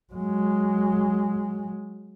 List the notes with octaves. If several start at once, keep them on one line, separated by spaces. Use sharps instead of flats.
F#3 G#3